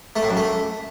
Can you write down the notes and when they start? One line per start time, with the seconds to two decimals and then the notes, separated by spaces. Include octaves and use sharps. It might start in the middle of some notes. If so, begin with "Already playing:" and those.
0.16 A3
0.23 A2
0.30 F#2
0.37 A3